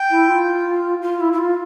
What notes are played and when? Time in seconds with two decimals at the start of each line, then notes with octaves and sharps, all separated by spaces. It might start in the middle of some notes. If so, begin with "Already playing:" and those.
Already playing: G5
0.10 E4
0.28 F4
1.02 F4
1.20 E4
1.33 E4
1.38 F4